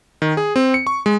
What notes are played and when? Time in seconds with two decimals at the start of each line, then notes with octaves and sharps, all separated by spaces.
0.22 D#3
0.37 G#4
0.56 C4
0.74 C#7
0.87 C#6
1.06 G#3